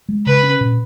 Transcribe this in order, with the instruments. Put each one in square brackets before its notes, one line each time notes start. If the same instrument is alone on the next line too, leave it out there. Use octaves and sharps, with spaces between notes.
[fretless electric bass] G#3
[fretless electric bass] C#3 [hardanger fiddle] B4
[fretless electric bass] C#4
A#2